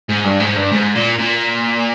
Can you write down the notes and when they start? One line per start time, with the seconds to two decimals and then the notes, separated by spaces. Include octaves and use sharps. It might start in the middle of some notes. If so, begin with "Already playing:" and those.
0.09 G#2
0.24 G2
0.40 G#2
0.56 G2
0.72 G#2
0.95 A#2
1.19 A#2